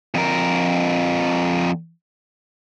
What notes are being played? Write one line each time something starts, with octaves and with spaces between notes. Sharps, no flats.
F2 A#4